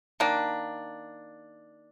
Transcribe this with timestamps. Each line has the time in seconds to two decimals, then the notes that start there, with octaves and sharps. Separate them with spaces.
0.20 D#3 A#3 D4